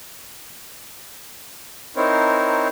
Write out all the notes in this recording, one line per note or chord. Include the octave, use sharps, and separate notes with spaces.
C4 D#4 E4 A#4 C5 C#5